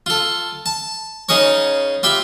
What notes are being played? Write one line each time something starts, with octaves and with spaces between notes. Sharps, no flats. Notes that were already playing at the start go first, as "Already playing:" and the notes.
F4 A4
A5
C#3 D#4 G#4 A#4 C#5
F4 G4 E5 B5